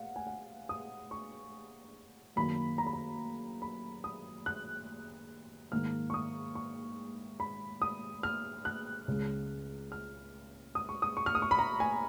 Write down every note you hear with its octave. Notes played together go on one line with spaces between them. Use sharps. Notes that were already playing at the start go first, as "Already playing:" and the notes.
Already playing: F5 F#5
G#5
F#5
D#6
C#6
F#2 D#3 A#3 B5
A#5
B5
A#5
B5
D#6
F#6
G#2 D#3 A#3 F6
C#6
D#6
C#6
B5
D#6
F6
F#6
C#2 C#3 G#3
F6
D#6
C#6
D#6
C#6
F6
D#6
C#6
B5
A#5
G#5